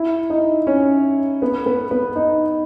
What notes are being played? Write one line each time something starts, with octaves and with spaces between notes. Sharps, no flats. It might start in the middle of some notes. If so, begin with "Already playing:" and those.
Already playing: E4 E5
D#4 D#5
C#4 C#5
B3 B4
B3 B4
B3 B4
D#4 D#5